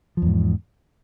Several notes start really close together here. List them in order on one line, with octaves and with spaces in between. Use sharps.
F3 E2 G#2